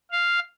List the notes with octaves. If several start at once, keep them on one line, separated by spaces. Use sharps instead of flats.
F5